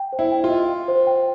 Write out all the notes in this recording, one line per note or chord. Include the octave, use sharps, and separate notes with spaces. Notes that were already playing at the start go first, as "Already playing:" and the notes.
Already playing: G5
C5
E4
G5
F4
D#5
G5
C5
G5